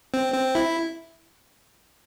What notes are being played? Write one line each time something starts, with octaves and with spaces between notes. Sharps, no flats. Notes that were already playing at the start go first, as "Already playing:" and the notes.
C4
C4
E4